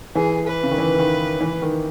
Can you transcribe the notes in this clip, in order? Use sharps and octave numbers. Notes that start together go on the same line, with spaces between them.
E3 G#4
B4
C#3
D#3
E3
D#3
E3
D#3